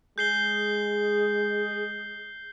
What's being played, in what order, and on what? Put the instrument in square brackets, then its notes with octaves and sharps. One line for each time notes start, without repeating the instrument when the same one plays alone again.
[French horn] G#3 [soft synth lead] G#4 [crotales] G6 C7 G7